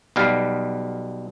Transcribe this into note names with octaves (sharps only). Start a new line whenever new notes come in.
B1 B2 G3 F5